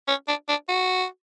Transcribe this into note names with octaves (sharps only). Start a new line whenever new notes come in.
C#4
D4
D4
F#4